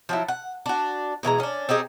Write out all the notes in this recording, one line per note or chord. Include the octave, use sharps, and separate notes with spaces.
F3 F#3 E4
F#5
D4 F#4
B2 E3 G#3 A#5
C#4 D4
C4 D#4 G4 G#4